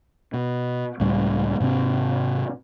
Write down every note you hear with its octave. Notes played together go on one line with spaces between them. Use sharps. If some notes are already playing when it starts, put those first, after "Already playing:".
B2
C#2 A2 G3
G#2 C3 A3 C4